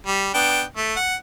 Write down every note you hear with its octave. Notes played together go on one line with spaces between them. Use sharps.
G3
B3 D4 G5
A3
F#5